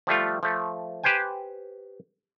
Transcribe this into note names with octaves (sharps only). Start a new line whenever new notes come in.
F3 G3 A3 F4
F3 A3
G4 B4 C5 G5 G#5